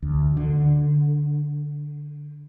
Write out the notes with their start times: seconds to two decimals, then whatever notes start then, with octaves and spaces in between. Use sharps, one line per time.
0.02 D2
0.37 D3